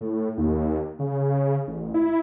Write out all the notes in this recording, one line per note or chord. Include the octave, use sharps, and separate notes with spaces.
A2
D#2
C#3
A1
E4